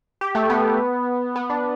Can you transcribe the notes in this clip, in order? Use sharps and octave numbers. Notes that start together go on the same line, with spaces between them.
G4
A3
B3
B3
D4